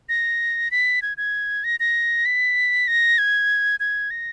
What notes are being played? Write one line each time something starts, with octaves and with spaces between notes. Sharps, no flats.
A#6
B6
G#6
G#6
A#6
A#6
B6
A#6
G#6
G#6
A#6